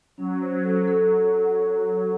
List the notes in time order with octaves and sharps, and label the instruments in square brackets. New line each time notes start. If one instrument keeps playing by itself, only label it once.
[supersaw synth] F#3 [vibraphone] C#4
[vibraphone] C5
A4
A4